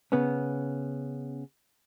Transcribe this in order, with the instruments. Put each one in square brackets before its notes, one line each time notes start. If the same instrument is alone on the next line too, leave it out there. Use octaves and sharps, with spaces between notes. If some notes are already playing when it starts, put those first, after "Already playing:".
[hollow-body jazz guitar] C#3 B3 C#4